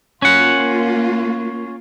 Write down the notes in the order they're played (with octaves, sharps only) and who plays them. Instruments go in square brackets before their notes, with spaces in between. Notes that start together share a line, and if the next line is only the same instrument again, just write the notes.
[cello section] A#3 F4 [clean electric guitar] C#4 F#5